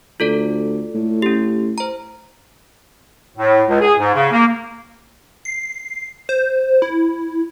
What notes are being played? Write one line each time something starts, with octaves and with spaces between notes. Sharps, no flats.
D2 F4 A4 D5
A2
C#4 G4
C5 A#5
A2
C#2
G#4
G#2
C#3
A#3
C7
C5
E4